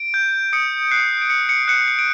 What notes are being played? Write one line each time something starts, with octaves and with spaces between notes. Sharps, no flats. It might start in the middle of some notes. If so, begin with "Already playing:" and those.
Already playing: D7
G6
D#6 C#7
F#6 C7
D7
D#6 C#7
C#7
F#6 C#7
C#7
D7